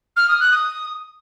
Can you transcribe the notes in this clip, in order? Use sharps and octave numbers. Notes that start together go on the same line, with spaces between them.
F6
D#6
F#6
D#6